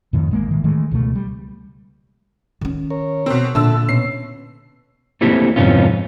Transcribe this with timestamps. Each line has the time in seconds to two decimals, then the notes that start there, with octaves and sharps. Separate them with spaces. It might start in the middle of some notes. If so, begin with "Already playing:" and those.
0.13 F2 A2 D#3
0.31 A1 G#3 A#3
0.51 A2 D#3
0.64 D#3 E3 G#3 A3
0.91 C#2 B2 F#3 A3
1.15 G3
2.61 D#3 C#4
2.90 A#4 C#5
3.26 B2 C4
3.55 A#2 D3 A4 E5 A5 E6
3.89 B2 C#4 C7
5.21 A3 A#3 C4 E4 G4
5.56 F2 G#2 C3 B3 C#4 F4